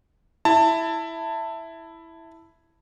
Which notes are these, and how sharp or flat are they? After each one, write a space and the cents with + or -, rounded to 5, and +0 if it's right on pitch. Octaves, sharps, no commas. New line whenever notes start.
E4 +0 A5 +20